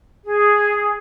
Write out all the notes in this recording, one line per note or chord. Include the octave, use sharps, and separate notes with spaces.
G#4